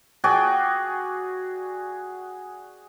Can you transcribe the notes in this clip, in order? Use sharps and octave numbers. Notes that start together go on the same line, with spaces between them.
F#4 G#4 D5 G5